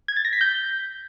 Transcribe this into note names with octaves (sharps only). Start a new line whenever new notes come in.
G#6
A6
A#6
B6
G6